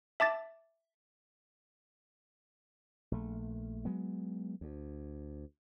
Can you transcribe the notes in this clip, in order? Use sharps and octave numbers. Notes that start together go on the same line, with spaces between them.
E5 A5 D6 A6
A#1 A3
F#3 G#3 B3
D2